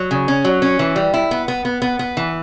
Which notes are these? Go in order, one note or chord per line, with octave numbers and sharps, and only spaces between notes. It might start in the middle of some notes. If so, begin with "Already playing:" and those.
Already playing: F#3
C#3
C#4
F#3
C#4
E3
G3
E4
B3
B3
B3
B3
B3
E3